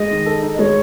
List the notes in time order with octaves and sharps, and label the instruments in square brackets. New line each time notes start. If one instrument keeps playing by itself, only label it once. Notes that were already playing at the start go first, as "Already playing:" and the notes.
Already playing: [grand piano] G#3 [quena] D#5
[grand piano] D#3
A4
D#4
[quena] D#5
[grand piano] G#3 [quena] C#5